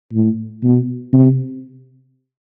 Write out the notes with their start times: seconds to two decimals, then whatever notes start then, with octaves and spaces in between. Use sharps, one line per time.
0.13 A2
0.63 B2
1.13 C3